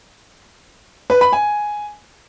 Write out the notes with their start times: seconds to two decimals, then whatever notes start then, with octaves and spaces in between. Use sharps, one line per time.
1.10 B4
1.21 B5
1.33 G#5